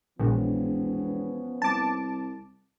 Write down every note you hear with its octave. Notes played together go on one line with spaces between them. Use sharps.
E1 A#1 F3 B3 C#4
C2 A5 D6